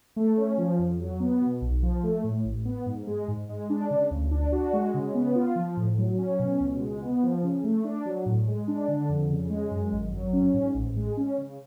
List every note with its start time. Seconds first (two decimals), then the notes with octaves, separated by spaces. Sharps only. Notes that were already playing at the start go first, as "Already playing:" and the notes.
0.16 A3
0.37 C#4
0.58 F3
0.79 F2
1.00 F#3
1.20 B3
1.41 B2
1.61 B1
1.83 F3
2.03 A3
2.24 A2
2.45 A1
2.65 B3
2.86 G#2
3.07 G#3
3.28 G#2
3.49 G#3
3.70 D4
3.90 C#3
4.11 D2
4.31 D4
4.52 F#4
4.73 G#3
4.94 C#3
5.14 B3
5.35 F4
5.55 F3
5.77 A2
5.98 F#3
6.18 C#4
6.39 B2
6.60 C#2
6.80 G#3
7.02 B3
7.23 F3
7.43 C#3
7.64 A3
7.84 D4
8.05 F#3
8.26 A2
8.47 G#3
8.68 D4
8.88 D3
9.09 F2
9.30 C#3
9.50 G#3
9.71 F#2
9.92 G#1
10.13 F#3
10.33 C#4
10.54 G#2
10.74 A1
10.96 G#3
11.17 C#4
11.38 C#3